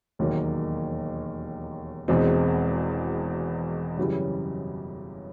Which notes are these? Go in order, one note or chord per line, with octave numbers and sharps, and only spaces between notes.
E1 D#2 D#3 F#3 A#3
E1 E2 B2 G#3 C4
F#2 C#3 E3 G3